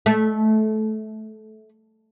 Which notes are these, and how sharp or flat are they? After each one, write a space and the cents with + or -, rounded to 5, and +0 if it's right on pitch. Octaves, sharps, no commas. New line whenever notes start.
A3 -20